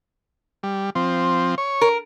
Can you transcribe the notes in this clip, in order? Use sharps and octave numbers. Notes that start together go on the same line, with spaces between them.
G3
F3 C4
C#5
A#4